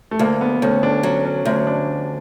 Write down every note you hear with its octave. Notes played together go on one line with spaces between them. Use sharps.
A3
D2 A#3
B3
D2 C#4
D4
F#3 C#4
C#4
D2 C#4
D4